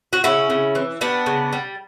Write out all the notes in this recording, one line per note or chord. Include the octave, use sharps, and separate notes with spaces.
F#4
C#3 C#4 E4
C#3
E3
G3 B3 D4
C#3
G3